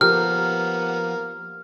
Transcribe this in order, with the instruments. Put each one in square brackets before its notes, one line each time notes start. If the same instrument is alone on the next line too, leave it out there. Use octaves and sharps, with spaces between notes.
[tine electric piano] F3 [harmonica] A#3 B3 [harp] G4 A#4 [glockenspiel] F6